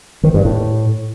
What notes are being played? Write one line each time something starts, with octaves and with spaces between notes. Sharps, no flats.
D#3
G2
A2